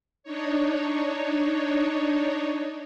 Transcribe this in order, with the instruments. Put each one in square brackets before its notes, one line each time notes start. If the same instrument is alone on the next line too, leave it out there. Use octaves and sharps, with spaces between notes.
[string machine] D4 D#4 C#5